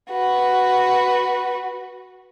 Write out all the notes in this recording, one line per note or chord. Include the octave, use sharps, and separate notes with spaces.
F#4 B4